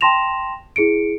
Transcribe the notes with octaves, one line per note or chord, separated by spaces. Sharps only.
G5 A5 C6 A#6 E7 F7
E4 G#4 C#7 D7